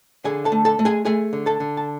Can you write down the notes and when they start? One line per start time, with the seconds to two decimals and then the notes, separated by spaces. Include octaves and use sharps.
0.25 D3 G#4 G#5
0.45 A4 A5
0.52 A3
0.65 A4 A5
0.79 A3
0.85 G#4 G#5
1.05 A3 G#4 G#5
1.33 D3
1.46 A4 A5
1.60 D3
1.77 A5